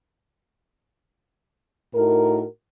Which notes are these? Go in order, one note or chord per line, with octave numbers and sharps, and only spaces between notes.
A2 D#4 F#4 A#4